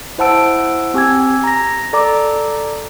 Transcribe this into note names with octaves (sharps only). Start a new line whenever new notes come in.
E4 C5 F#5 A5 E6 D7
C4 G4 G#5 E6 G#6
A#5 A#6
A4 D5 A#5 D6